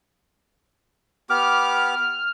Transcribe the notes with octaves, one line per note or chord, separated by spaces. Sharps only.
B3 G4 D6 F6